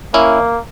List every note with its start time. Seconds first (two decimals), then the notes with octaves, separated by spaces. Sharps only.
0.14 A#3 C#4 E4